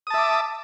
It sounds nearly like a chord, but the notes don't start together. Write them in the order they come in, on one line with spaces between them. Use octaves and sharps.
D#6 A5 E5 D6